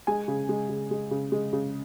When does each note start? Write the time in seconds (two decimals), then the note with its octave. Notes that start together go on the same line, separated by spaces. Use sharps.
0.07 G#3 G#5
0.28 C#3
0.49 G#3
0.69 C#3
0.91 G#3
1.11 C#3
1.32 G#3
1.53 C#3